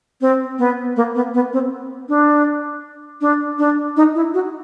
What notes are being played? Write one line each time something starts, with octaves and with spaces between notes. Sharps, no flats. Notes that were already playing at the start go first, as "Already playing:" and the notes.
C4
B3
A#3
B3
B3
C4
D4
D4
D4
D#4
E4
F#4